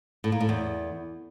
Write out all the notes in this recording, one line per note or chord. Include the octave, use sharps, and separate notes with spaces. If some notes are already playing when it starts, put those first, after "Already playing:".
A2
A#3
A2
E2